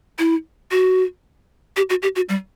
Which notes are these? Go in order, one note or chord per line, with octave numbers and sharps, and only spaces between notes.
E4
F#4
G4
F#4
G4
F#4
G3